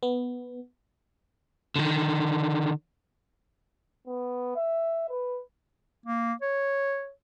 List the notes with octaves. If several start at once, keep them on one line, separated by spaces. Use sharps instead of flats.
B3
D3 D#3
B3
E5
B4
A#3
C#5